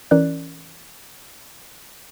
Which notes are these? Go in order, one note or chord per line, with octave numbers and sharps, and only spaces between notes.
E3 C#4 A#4 D5 F#6